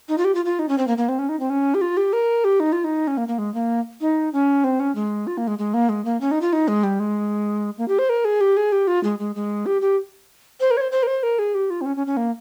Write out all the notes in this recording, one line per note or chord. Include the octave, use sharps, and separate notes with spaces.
D#4
F4
G4
F4
F4
D#4
C#4
C4
A#3
A#3
C4
C#4
D#4
C4
C#4
G4
F4
G4
A#4
G4
D#4
F4
D#4
C#4
A#3
A#3
G#3
A#3
D#4
C#4
C4
C#4
G#3
F4
A#3
G#3
G#3
A#3
G#3
A#3
C#4
D#4
F4
D#4
G#3
G3
G#3
A#3
G4
C5
A#4
G#4
G4
G#4
G4
F4
G#3
G#3
G#3
G4
G4
C5
A#4
C#5
C5
C5
A#4
C5
A#4
G#4
G4
F4
C4
C#4
C#4
C#4
A#3